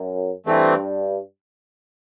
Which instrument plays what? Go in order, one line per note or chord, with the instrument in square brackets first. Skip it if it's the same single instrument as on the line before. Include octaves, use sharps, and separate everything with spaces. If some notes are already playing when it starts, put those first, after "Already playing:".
Already playing: [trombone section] F#2
[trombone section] G2 [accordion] E3 A3 C4